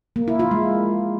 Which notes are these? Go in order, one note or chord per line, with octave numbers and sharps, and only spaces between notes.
A#3
E4
F4
G#3